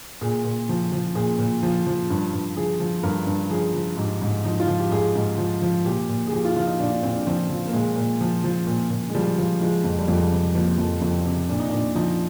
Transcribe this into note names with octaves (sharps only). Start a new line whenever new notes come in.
A#2 G#4
A#2
F3
F3
A#2 G#4
A#2
F3
F3
G2
G2
F3 G#4
F3
G2 A#4
G2
F3 G#4
F3
G#2 G4
G#2
F3 D#4
F4
F3
G4
G#2 G#4
G#2
F3
F3
A#2 G4
A#2
G#4
F3 G4
F4
F3 F4
D#4
A#2 D4
D4
A#2 C4
D4
F3 C4
F3
A#3
A#2 G#3
A#2
F3
F3
A#2
A#2
G#3
F3 G3
F3
F3 G#3
F2
G3
F2 G#3
C3
F3 A#3
F2
F2 C4
C3
A#2 D4
D#4
A#2 D4
F3 D#4